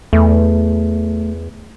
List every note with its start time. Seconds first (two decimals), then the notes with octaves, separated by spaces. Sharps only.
0.13 E2 A3